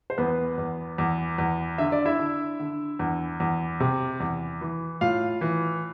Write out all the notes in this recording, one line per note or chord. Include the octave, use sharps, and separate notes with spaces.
C5
E2 B3 B4
E2
E2
E2
D3 E5
D5
E4 E5
D3
D3
E2
E2
C3
E2
E3
A2 F4 F5
E3